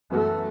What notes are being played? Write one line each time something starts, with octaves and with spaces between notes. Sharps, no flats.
F#2 E3 A3 B3 F#4